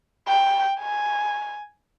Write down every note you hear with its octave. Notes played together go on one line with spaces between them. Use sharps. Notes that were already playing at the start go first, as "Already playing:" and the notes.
G5
G#5